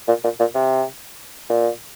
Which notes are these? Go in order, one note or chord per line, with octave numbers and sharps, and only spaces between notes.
A#2
A#2
A#2
C3
A#2